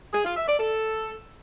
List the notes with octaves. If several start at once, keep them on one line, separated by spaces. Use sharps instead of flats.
G#4
F4
E5
D5
A4